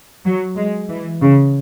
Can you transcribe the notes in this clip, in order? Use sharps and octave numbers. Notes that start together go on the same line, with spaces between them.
F#3
G#3
E3
C#3